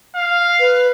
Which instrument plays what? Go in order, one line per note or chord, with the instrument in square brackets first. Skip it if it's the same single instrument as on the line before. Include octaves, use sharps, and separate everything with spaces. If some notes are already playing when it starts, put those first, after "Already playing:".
[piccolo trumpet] F5
[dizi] B4